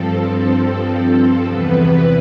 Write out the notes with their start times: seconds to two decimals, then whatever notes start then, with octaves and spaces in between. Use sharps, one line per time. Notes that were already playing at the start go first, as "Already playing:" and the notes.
Already playing: G2 F3 C4 A4
1.46 E2 C3 E3 B3 B4